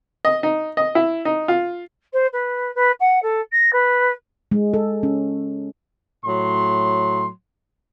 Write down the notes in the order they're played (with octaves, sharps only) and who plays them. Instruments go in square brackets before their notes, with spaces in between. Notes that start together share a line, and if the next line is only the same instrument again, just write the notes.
[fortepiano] D#5
D#4
D#5
E4
D#4
F4
[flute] C5
B4
B4
F#5
A4
A#6
B4
[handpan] G#3
A4
C#4
[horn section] A2 F#3 C6